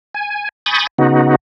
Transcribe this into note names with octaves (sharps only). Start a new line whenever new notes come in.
G#5
G#5 B5 C#6 D#6 G6 A6
C#3 B3 D#4 F#4